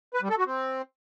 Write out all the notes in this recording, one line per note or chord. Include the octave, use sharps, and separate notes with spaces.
B4
G3
A4
F#4
C4